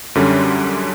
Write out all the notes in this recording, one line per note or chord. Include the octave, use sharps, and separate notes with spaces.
F#2 D3 G3 C#4